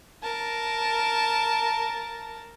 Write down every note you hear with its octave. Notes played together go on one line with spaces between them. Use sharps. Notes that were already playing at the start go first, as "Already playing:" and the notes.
A#4 A5